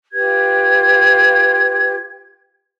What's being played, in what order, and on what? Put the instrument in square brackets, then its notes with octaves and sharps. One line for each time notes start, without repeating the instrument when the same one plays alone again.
[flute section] F4 G4 B4 G#6